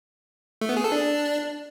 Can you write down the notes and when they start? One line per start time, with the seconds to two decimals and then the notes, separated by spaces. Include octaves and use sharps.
0.61 A3
0.69 B3
0.77 G#4
0.84 A4
0.92 D4